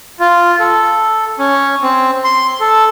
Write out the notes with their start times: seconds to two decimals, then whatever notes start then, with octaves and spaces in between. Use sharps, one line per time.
0.20 F4
0.59 A4
1.39 C#4
1.82 C4
2.25 C6
2.60 A4